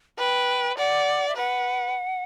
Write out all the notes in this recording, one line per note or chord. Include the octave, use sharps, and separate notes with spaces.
B4 G5
D5 F#5
E5
B4 F#5